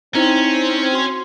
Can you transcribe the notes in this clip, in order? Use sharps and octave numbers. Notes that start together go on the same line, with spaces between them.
C4 C#4 D#4 E4 A#5
F#4 C6